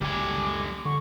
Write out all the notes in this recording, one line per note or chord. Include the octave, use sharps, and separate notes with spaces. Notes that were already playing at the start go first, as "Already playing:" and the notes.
F#1 C#2 A#2 G3 G#5 D6
D3 C#6